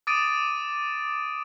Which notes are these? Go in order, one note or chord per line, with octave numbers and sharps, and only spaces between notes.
D6 D#6 A6 D7 D#7